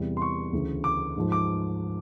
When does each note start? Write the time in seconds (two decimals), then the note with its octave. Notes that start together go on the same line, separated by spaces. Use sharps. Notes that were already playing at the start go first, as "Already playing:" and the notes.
Already playing: E2 C3 E3 G3
0.17 C6
0.22 C#6
0.53 D2 C#3 E3
0.84 D6
1.16 G#2 F3
1.32 D6